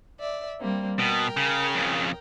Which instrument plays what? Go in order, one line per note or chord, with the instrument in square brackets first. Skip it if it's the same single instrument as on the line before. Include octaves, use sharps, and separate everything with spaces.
[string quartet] D5 E5
G3 A#3 C4
[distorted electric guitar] B2 [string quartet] A#4 G5
[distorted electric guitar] C#3
F2 C#3